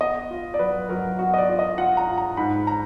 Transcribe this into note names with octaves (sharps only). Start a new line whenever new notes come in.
B3 D#5
F4
D5
F#3 B4
F#3 A#4
B3 F#4
D#5
D5
F4
D#5
F4 F#5
A#5
F4
A#5
G#2 B5
A#5